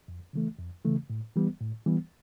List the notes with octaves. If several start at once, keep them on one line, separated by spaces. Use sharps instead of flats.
F2
C#3 E3 A3
F2
C#3 E3 A3
A2
E3 G3 B3
A2
E3 G3 B3